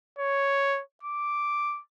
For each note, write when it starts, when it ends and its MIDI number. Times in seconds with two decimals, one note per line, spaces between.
0.19 0.81 73
1.03 1.81 86